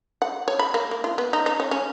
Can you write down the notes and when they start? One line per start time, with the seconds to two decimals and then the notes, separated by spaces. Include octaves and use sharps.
0.22 F#5
0.48 C#5
0.59 B5
0.74 A#3
0.91 A#3
1.04 F4
1.18 B3
1.33 D#4
1.46 D#4
1.60 C#4
1.71 C#4